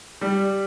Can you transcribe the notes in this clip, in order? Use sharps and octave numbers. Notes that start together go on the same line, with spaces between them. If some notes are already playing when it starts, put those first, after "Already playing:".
G3